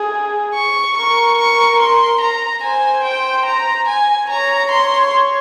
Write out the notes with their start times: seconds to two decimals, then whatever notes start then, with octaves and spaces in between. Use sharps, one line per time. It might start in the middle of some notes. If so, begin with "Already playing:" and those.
Already playing: G#4
0.55 C#6
0.97 A#4 C#6
1.39 C#6
1.81 C6
2.21 A#5
2.64 C5 G#5
3.05 G5
3.46 A#5
3.89 G#5
4.30 C#5 A#5
4.71 C6